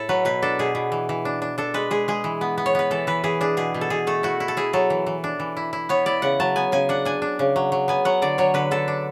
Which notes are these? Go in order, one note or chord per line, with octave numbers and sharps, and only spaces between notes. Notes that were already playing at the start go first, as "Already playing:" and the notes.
Already playing: A2 E4 A4
F#3 B4
B2 B4
D4 A4
B2 G#4
B2
E3
E3
D4
D4
D4 A4
G#3 B4
G#3 G#4
G#3 G#4
E3
B3
B3
C#5
B3 B4
E3 A4
E3 B4
E3 G#4
D4 G#4
B2 G#4
B2
A4
B2 G#4
A3 A4
E4 F#4
E4
A4
E4 G#4
F#3 A4
E3
E3
D4
E3
E4
E4
B3 C#5
E4 D5
C#3 F#5
F#3 A5
B3 G#5
C#3 G#5
D4 F#5
D4 G#5
D4
C#3
F#3
F#3
B3 G#5
F#3 F#5
D3 D5
F#3 C#5
D3 B4
D3 A4
D4